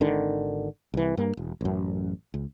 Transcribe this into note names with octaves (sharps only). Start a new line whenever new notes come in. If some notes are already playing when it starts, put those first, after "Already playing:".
G#1 D3 D#3
C2 E3
G2 A#3
E1
A1 F#2
C#2